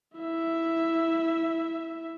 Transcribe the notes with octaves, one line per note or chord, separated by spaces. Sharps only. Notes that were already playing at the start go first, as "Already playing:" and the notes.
E4 E5